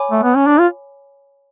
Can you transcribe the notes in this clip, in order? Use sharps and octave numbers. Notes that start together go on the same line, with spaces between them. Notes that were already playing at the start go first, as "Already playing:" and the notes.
Already playing: C#5 G#5 B5 D6
A3
B3
C#4
D4
F4